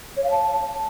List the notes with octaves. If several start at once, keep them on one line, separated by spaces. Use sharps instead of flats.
C#5
F5
A5